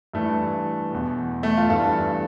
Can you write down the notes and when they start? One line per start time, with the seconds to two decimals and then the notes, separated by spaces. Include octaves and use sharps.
0.14 G2 E3 A3
0.91 E2 B2
1.43 A3
1.57 F4
1.69 G2 E3 A4